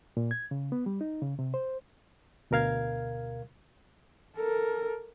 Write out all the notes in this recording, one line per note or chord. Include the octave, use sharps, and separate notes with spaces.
A#2
G#6
C#3
B3
G3
D#4
C#3
C3
C5
D2 B2 A#4 F5 G#6
A4 A#4